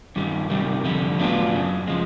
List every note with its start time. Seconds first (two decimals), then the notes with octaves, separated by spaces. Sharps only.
0.16 G2 D#3 G3
0.50 C3 D#3 G3
0.85 F2 D3 G3
1.19 A2 F#3 B3 D4 F4
1.53 F#2 C#3
1.87 F3 G#3